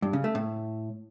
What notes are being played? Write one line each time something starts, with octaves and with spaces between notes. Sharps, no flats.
G2
C#3
A3
A2